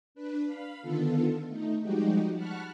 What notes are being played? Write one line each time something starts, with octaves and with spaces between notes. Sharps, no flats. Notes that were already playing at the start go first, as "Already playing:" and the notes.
D4 B4
F5 B5
D3 D#3 B3 F4 A4
A3 D#4
F3 G3 G#3 D#4 F#4 G4
F#5 A5 B5 C#6 F6 F#6